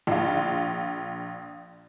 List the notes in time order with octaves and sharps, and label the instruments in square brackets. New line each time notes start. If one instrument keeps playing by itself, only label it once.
[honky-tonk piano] A#1 F4